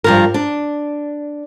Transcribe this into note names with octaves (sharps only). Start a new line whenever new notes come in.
G2 F3 A#4
D4